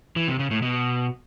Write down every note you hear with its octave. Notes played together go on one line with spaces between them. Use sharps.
E3
C3
C#3
A2
B2